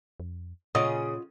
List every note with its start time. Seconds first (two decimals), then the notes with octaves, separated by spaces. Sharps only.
0.20 F2
0.75 A#2 C#3 F4 D#5 F#5 D#6